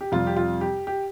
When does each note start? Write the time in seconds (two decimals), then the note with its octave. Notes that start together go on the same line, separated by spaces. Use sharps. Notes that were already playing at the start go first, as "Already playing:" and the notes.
0.01 G4
0.12 F2 C3 G3 F4
0.27 G4
0.36 F4
0.61 G4
0.87 G4